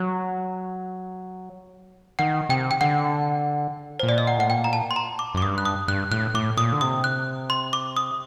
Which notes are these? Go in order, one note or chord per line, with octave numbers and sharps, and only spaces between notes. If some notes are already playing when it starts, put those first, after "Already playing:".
Already playing: F#3
D#3 F#5
C3 G5
G5
D3 F#5
A#2 C5
D5
D#5
F#5
A2 F#5
A#2 G5
A#5
A5
C6
A#5
D6
F#2
D6
G2 D#6
F#6
D#6
G2 F#6
A2 F#6
A2 D6
A#2 D#6
D3
C3 D#6
F#6
C6
D6
D#6